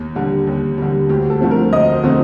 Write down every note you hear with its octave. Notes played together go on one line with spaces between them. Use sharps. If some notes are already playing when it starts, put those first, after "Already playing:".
Already playing: D#2
D3 G3
D#2
D3 G3
D2 G4
A4
D3 F3 A3 C4
A#4
D2 D#5
C5
D3 F3 A3 C4